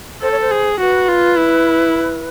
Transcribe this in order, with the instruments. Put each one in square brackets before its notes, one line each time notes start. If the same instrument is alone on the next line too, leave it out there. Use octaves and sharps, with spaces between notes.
[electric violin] A4 [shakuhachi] C5
[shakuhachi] C#5
C5
[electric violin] G#4
[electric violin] F#4 [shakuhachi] B4
[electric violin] F4
E4